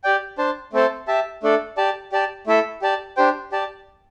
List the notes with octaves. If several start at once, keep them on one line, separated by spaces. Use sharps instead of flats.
G4 D5 G5
D4 C5 A5
A3 C4 A4 C5 A5
G4 E5 A5
A3 D4 A4 D5
G4 D5 A5
G4 D5 A5
A3 E4 A4 E5
G4 D5 A5
D4 G4 C5 G5
G4 D5 A5